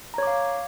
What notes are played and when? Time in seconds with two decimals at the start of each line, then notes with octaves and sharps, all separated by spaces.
0.14 A#5
0.18 C#5
0.23 D6
0.27 F5